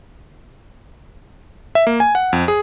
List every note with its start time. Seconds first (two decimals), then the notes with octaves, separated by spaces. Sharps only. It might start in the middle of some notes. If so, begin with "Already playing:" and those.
1.75 E5
1.87 A#3
2.00 G#5
2.15 F#5
2.33 F2
2.48 G#4